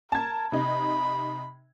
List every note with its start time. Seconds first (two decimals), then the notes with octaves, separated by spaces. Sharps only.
0.12 A#4 A5 G#6
0.52 C3 D#4 B5